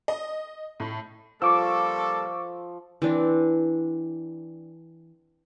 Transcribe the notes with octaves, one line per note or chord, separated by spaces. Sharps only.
D#5
A2
F3 G3 A#3 A4 C#6 D6 E6
E3 C4 D4